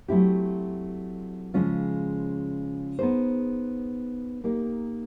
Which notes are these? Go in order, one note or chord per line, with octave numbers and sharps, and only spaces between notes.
F#3 A3 C4 E4 G4
C#3 F3 G#3 C#4 F4
B3 D#4 G#4 C5
A#3 D#4 G4 A#4